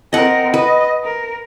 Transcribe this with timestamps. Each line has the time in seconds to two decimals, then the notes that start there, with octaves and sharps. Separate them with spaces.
0.13 C4 A#4 D#5 F#5
0.54 B4 D#5
1.04 A#4